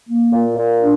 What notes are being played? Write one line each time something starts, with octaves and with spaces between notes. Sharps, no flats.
A#3
A#2
A#2
D4